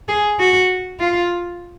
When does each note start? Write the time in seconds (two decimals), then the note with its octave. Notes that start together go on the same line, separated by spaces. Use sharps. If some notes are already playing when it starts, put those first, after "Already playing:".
0.08 G#4
0.39 F#4
1.00 F4